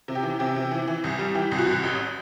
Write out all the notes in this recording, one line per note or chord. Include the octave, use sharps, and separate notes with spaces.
C3
G4
E3
C3 G4
C3
E3
E3
C2
G3
E3 G4
C2
F#4
C2
A1